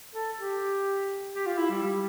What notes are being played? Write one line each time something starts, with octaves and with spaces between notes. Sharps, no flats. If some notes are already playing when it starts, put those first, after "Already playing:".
A4
G4
G4
F4
E4
G3
G3